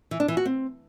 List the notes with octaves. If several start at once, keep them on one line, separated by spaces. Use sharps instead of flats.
E3
D4
E3
F#4
C4